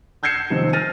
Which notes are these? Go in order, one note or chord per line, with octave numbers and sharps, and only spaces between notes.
E6 G6 G#6 C7 C#7 E7
C3 D#3 F3 C4
F6 A6 A#6 D#7